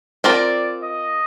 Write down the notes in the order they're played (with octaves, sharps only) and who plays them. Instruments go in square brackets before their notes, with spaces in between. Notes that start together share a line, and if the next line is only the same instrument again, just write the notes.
[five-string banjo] C4 F4 A#4 [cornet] D5
[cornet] D#5